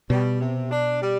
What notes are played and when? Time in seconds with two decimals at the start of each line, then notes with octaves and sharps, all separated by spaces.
0.09 B2 G3
0.40 C3
0.70 D4
1.00 G3